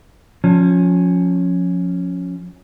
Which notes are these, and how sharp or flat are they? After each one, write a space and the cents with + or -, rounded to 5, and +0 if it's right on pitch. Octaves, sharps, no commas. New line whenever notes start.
F3 +30 C#4 +0